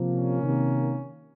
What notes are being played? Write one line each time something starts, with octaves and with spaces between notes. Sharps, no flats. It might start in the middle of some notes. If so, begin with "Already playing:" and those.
Already playing: C3 F3 A#3
C#4
C3 D#3 A#3